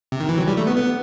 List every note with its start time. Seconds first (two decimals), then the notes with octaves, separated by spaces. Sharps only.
0.12 C3
0.20 D#3
0.29 E3
0.38 F#3
0.48 G3
0.57 A3
0.67 B3
0.77 B3